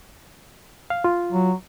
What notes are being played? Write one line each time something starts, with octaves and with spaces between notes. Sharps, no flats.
F5
F4
F#3